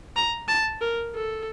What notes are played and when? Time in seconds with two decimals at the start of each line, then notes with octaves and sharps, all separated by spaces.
0.16 A#5
0.48 A5
0.81 A#4
1.15 A4